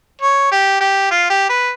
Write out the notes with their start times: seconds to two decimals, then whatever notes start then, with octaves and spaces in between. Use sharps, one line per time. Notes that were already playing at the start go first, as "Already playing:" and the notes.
0.22 C#5
0.52 G4
0.81 G4
1.11 F4
1.30 G4
1.49 B4